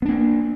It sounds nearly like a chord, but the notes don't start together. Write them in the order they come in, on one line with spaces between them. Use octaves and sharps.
B3 D4 A#3